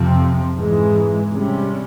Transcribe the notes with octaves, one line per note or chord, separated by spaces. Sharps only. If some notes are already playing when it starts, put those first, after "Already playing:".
Already playing: F2 C3 F3 C4
G#2 E3 G#3
C3 G3 C#4